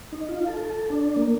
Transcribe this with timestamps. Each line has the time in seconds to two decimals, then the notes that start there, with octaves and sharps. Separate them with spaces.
0.12 D#4
0.29 F4
0.46 A4
0.63 A4
0.90 D4
1.16 A#3